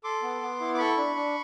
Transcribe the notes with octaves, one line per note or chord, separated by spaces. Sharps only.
A4 C6 D6
B3
B3
E4
D6
A4 B5 C#6
D4
D4